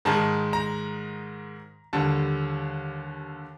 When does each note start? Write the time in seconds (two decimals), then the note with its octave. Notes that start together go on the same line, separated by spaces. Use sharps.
0.05 G#2 D#3 G#3 A5
0.53 A#5
1.93 D#2 D3 G3 A5